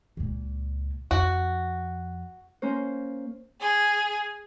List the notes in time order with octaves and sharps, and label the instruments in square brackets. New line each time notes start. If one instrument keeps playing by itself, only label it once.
[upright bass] C#2 A#2
[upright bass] F2 [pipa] F#4
[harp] A#3 C#4 C5
[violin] G#4